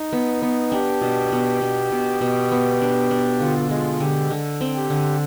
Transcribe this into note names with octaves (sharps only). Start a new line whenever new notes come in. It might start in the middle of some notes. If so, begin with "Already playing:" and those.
Already playing: D#4
B3
B3
D4 G4
B2
B2
B2
B2
B2
B3
D4
D4
D3 F4
G#3 F4
D3 G4
D3
C4
G4
D3